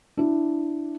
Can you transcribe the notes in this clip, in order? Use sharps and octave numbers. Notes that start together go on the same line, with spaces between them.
D4 E4